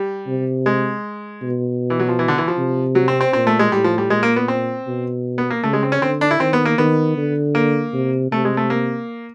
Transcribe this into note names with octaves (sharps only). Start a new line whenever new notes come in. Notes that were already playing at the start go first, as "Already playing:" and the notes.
Already playing: G3
C3
G#3
B2
E3
F#3
F3
E3
D3
E3
F3
C3
F#3
C4
C4
A#2 C4
A3
G#3
A2 G3
F3
G3
A#2 G#3
A#3
B3
C4
B2
B3
A#3
C#3 A3
G#3
C4
C#4
D3 C4
D4
E4
D#3 C4
B3
A#3
D#3 B3
D3
A#3
C3
C3 A3
G#3
A3
A#3